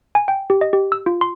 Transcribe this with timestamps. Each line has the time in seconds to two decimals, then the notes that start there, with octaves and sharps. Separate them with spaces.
0.15 G#5
0.28 G5
0.50 G4
0.61 D#5
0.73 G4
0.92 E6
1.06 F4
1.21 C6